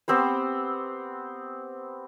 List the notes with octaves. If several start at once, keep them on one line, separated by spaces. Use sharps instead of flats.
B3 C4 G4 C5